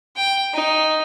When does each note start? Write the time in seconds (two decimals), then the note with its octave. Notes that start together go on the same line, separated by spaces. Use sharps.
0.17 G5
0.54 D#4